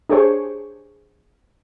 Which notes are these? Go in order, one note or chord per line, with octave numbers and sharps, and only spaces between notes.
D4 G4 G#4 C5 C#5